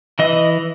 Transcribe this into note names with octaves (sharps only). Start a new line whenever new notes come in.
E3 D#5